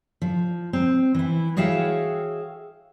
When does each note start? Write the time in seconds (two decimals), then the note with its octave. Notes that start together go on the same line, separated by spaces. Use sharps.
0.22 F3
0.73 C4
1.15 E3 E4
1.57 F#4 G#4 C#5 E5 F5 G5